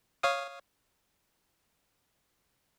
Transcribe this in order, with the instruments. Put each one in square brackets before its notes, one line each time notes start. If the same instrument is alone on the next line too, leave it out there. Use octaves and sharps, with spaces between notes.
[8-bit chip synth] C#5 F5 D#6